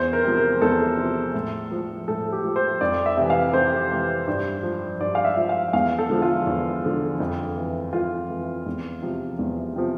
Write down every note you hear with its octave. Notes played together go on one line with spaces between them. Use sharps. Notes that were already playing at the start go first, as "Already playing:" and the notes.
Already playing: E2 C5
A#4
C3 F3
A#4
E2 A4
C3 F3
A2
F3
A2 A4
G4
F3
C5
F2 D5
E5
C3 E3
F5
F2 C5
C3 E3
G2
F3
G2 D5
F5
E5
F3
F5
E2 F5
A4
D3 F3
F4
E2
D3 F3
F2
E3
F2 F4
E3
E2
C3 F3
E2
C3 F3